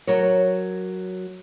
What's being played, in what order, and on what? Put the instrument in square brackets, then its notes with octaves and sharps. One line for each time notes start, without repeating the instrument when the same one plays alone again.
[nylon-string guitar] F#3 A#4 C#5